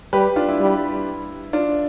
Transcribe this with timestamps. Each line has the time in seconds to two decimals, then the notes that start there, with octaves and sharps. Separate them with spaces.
0.13 G3 G4 B4
0.36 D4 F4
0.48 E4
0.59 G3
1.53 D4 F4